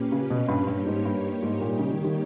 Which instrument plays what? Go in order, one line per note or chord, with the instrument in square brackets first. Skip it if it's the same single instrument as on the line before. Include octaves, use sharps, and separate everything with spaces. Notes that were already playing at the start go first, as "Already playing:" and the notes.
Already playing: [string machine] A#2 A#3 C#4 G4 B4
[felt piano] C#3
B2
G2
[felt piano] G2 [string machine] G3 A#3 D#4 G4 C#5
[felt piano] G#2
G2
G#2
A#2
C#3
D#3
D#3